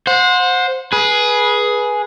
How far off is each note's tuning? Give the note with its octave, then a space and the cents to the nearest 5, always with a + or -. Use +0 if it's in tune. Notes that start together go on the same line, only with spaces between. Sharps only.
C5 +0 F#5 -30
G#4 +10 B4 -20